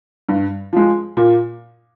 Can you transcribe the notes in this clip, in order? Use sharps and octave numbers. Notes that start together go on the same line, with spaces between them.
G2
F3 G#3
A#2